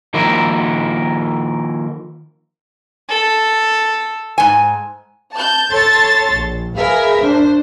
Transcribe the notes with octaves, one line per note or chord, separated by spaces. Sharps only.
D#3 F3 A#3 E4 A#4 C5
A4
G#2 G#5
A5 G6
A4 C#5 A5 C6 A6
A#1
G#4 A#4 B4 E5 F5
D4 C5